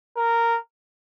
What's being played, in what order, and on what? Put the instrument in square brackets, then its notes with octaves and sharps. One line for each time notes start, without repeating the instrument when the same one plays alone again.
[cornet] A#4